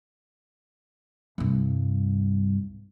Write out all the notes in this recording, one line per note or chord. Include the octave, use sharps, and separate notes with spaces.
C2 G2